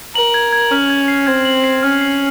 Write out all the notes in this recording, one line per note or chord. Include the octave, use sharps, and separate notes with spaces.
A#4 F#7
G#6
G#6
C#4 F6
G#6
C7
C4 G#6
F#7
C7
C#4 F6
C7